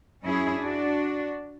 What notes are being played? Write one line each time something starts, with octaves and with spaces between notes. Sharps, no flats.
F#2 C#4 E4 G#4
D4 F#4